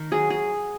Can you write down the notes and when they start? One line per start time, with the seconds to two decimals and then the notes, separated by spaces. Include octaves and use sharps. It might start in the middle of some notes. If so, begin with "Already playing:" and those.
Already playing: D#3 A#4
0.11 F#3 G#4
0.30 G#4